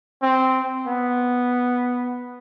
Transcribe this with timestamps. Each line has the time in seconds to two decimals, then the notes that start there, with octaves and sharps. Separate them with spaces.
0.22 C4
0.87 B3